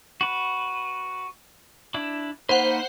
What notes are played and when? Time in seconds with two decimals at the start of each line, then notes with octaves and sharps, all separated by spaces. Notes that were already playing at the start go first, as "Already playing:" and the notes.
0.21 F#4 B4
1.94 D4 E4
2.49 A#3 D#4 B4 C5 F#5